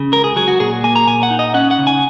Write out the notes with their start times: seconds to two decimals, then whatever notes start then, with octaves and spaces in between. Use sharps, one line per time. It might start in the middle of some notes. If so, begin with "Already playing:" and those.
Already playing: C#3
0.12 C#2 A#4
0.24 G#4
0.36 F#3 G#4
0.48 F#4
0.59 A#2 G#4
0.84 A#3 G#5
0.96 A#5
1.07 A#2 G#5
1.23 F#5
1.30 D#4
1.39 D#5
1.54 C#4 F#5
1.71 F#5
1.79 C#3
1.87 G#5